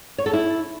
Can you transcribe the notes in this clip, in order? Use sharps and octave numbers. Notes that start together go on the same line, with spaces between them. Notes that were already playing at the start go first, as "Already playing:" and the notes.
C#5
A4
E4